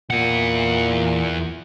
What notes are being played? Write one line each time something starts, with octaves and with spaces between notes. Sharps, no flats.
E2 A#2 F#5